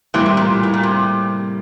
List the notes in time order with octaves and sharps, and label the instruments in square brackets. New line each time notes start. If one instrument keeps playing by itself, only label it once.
[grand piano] A2 G3 A#3 [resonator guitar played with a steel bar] C3 E3
[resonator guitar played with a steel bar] C3
A#2
A2
A#2
C3